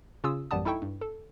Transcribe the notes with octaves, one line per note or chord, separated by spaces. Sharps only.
C#3 C#4 F4 D#6 E6
A1 F#2 G3 B3 A5 D#6
D#4 E4 A4 G5 C#6
G2
A4